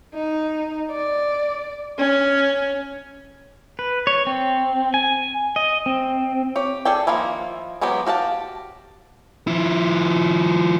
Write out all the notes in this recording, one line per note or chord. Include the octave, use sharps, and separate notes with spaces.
D#4
D5
C#4
B4
C#5
C4
G#5
D#5
C4
G4 C#5
G#4 A4 D5 G5
D#3 F3 A#3 D#4 E4
E3 F#3 G#3 B3 G4
F#4 G4 F5 A5
F3 E4